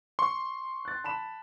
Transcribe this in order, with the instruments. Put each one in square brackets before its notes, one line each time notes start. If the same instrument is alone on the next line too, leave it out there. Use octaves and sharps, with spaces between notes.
[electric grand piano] C6 [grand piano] C#6
[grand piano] F#6 A6
A5 B5 E7